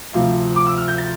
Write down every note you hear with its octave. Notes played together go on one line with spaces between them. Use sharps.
D2 C3 F3 F5
D6
E6
F6
G6
A6